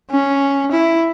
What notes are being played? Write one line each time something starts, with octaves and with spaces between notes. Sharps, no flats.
C#4
E4